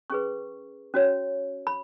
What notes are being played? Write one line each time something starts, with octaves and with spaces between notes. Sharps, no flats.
C#4 G#4 B4 C#6
C#4 F#4 C#5
B5